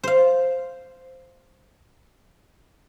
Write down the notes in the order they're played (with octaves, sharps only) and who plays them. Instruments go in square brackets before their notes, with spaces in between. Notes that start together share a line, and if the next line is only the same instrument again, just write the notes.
[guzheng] C5 F5